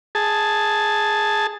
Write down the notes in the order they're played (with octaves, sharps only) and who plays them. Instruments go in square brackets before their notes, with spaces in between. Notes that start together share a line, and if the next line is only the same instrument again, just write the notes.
[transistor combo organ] G#4 A5